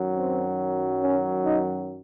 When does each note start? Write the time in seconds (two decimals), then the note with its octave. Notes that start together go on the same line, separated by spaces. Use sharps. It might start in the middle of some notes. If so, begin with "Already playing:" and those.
Already playing: F#2 D#3 F#3
0.16 C4
1.01 C#4
1.44 D#4